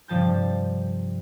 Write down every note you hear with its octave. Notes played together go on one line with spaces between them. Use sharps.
G2 C3 F3 A5 G6